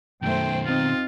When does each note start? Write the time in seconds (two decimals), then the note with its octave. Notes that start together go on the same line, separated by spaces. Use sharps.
0.22 F#2 B2 D#3 A3 C5 G5
0.65 C4 D#4 F4